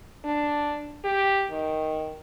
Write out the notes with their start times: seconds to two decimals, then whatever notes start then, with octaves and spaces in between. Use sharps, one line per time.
0.24 D4
1.04 G4
1.51 D#3